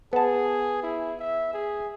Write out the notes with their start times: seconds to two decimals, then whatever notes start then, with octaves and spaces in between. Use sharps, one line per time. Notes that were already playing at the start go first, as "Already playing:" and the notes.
0.13 B3 G#4 A5
0.83 E4
1.19 E5
1.53 G#4